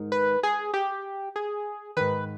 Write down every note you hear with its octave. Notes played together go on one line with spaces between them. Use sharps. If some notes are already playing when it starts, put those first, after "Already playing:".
Already playing: G#2 D#3
B4
G#4
G4
G#4
G#2 D#3 B4